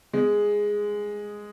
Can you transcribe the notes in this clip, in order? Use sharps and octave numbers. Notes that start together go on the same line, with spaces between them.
G#3